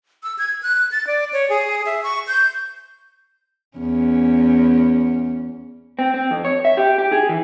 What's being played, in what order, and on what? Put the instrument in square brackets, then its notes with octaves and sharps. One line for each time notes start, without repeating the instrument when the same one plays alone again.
[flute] E6
G#6
F#6
A6
D5
C#5
G#4
E5
C#6
G6
[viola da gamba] E2 C#4
[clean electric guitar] C4
C4
F2
C#5
E5
G4
G4
G#4
E3